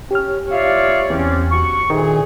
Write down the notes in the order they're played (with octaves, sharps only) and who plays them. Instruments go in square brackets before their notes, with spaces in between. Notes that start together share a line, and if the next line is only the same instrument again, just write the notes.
[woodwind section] C#4 [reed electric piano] G4 F6
[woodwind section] F4 E5 F5 [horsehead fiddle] C#5 D5
[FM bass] E2 [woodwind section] C4 C#4
[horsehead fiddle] F#4 [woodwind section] C#6
[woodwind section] D2 A#2 [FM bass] D#3 [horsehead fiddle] G#4